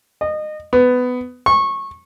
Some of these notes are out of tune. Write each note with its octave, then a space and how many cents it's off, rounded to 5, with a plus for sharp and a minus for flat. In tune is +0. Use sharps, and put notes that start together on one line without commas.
D#5 -25
B3 +15
C#6 -20